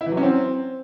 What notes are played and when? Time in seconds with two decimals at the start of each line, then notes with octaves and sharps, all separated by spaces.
0.01 E4
0.06 E3
0.12 F#3
0.17 C#4
0.23 C4